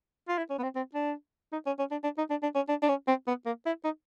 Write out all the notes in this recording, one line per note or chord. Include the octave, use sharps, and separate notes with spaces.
F4
E4
C#4
B3
C4
C4
D4
D#4
C#4
C#4
D4
D4
D#4
D4
D4
C#4
D4
D4
C#4
C4
B3
A#3
E4
D#4